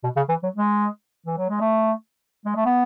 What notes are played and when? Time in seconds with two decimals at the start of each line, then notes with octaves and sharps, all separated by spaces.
0.03 B2
0.16 C#3
0.29 E3
0.43 F#3
0.56 G#3
1.26 E3
1.38 F#3
1.49 G#3
1.61 A3
2.46 G#3
2.56 A3
2.65 B3